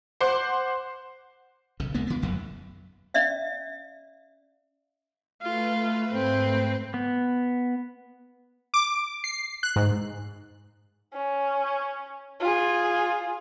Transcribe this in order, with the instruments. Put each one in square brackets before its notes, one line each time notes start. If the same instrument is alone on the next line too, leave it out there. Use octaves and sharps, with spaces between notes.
[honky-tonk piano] C5 F#5 C6 D6
[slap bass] B1 C#3
D#2 G#3 A#3 B3
C#3 B3
D1 A1 F2 F#3
[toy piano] C#4 D5 E5 F5
[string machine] A3 B4 [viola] F4
[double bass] G#2 [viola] C4
[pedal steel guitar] B3
[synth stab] D6
C7
F#6
G#2
[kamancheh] C#4
F4 G#4